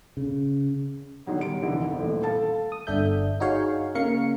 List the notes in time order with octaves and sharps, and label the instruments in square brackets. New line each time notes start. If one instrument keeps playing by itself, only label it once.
[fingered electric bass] C#3
[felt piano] D3 D#3 F#3 B3
G3 D7
F1 D3 E3
D#1 A1 A3
A4 F5 A5
[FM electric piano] D#6
G1 D4 A4 E5 G6
D#4 F#4 G#4 C#5 F5
C#3 A#3 A#4 F5 C#7